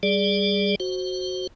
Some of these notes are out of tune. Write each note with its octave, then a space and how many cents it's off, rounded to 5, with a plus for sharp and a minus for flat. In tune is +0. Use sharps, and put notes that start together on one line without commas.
G3 +0 G#4 -10 D5 +0
F#4 +0 C5 +10